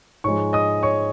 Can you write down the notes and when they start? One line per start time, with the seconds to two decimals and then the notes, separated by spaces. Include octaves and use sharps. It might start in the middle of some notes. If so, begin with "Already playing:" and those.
0.24 G#2 F3 G#3 C#5 C#6
0.53 D#5 D#6
0.83 C#5 C#6